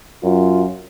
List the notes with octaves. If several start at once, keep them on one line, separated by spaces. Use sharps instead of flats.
F#2 F4